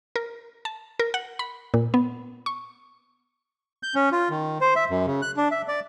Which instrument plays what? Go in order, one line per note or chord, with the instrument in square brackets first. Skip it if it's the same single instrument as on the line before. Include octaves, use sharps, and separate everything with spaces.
[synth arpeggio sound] A#4
A5
A#4
F#5
B5
A#2
B3
C#6
[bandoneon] G6
C#4
F4
D#3
C5
E5
F#2
C#3
F#6
D4
E5
D5